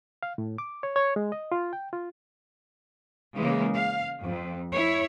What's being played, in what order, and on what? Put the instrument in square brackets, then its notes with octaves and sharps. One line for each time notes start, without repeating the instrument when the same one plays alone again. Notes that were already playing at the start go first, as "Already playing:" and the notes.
[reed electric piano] F5
A2
D6
C#5
C#5
G#3
D#5
F4
G5
F4
[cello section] C#3 E3 G#3 A#3
F5
F2
E4 C#5